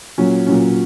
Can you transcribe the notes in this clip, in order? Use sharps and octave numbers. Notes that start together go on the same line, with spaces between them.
A#2 F#3 C#4
A#2 F#3 C#4